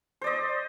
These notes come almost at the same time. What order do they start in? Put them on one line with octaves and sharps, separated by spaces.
C5 D5 D#5